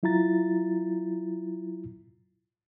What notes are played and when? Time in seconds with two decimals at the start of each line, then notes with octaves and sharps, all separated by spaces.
0.03 F#3 E4 F4 A#5 A6